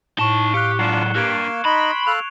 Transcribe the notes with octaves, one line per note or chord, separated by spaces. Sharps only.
A2 D#4 A5 C#6 G7
G4 F5 F#6 C#7
F#3 G#3 D4 F4 C7 E7
A#3 D4 G4 F5 F#6 G#6 D7
D#4 D#5 B5 C6
A4 F5 F#6 F7